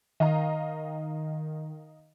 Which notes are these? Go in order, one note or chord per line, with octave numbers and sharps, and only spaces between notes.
D#3 D#5 F5 A#5